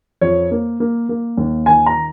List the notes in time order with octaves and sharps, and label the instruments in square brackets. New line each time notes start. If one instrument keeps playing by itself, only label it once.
[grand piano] F2 C#5
A#3
A#3
A#3
D#2
D#3 G#5
A#5